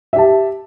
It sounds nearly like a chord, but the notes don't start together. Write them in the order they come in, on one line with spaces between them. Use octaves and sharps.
E5 G4 A5